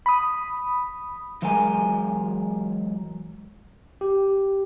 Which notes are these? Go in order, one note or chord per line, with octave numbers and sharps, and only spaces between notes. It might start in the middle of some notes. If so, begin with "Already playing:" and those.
B5 D#6
E3 F#3 G#3 A#4 G#5
G4